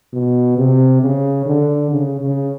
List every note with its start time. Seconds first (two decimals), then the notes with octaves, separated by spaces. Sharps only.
0.13 B2
0.58 C3
1.02 C#3
1.46 D3
1.91 C#3
2.21 C#3